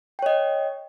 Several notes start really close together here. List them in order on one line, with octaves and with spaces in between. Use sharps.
G5 C#5 D#5